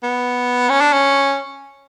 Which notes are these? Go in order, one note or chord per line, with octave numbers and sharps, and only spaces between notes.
B3
C#4
D4
C#4